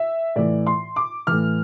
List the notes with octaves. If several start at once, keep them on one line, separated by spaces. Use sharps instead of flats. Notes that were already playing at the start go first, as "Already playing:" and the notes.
Already playing: E5
A2 E3 D5
C6
D6
A2 E3 F6